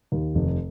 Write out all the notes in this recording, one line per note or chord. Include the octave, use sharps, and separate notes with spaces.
D#2
F1